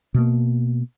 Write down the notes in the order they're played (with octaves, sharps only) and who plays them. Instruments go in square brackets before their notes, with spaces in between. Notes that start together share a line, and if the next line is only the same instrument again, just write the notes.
[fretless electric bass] B2 A#3